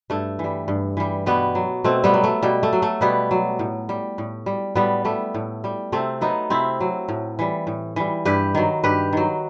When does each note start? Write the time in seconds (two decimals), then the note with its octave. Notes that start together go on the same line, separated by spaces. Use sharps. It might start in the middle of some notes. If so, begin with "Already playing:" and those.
0.10 G2 A3
0.39 E3 G3
0.68 G2
0.97 E3 G3
1.26 B2 G3 B3
1.55 F#3
1.84 B2 A3 C4
2.04 G3 B3
2.14 F#3
2.24 A3
2.43 B2 G3
2.63 A3
2.73 F#3
2.82 A3
3.01 B2 G3 B3
3.31 F#3
3.59 A2
3.89 G3
4.18 A2
4.46 G3
4.75 A2 G3 B3
5.05 G3 A3
5.34 A2
5.64 G3
5.92 C3 A3 C4
6.21 F#3 B3 D#4
6.50 C3 C4 E4
6.80 F#3
7.09 A2
7.39 E3 G3
7.67 A2
7.96 E3 G3
8.25 G2 G4 B4
8.55 D#3 F#3
8.84 G2 G4 B4
9.13 D#3 F#3